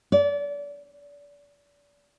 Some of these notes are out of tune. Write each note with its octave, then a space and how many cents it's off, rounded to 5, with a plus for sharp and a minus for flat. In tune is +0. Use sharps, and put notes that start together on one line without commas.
D5 -35